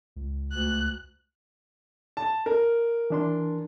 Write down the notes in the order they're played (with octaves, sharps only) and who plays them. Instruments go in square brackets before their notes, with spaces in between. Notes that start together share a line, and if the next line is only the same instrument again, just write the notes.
[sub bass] C#2
[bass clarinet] D2 [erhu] F#6
[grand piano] A5
A#4
[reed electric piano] E3 D4 C6